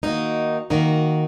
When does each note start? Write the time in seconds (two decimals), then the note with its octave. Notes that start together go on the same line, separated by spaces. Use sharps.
0.03 D#3 A#3 D#4 F#4
0.70 D#3 A#3 D#4 F#4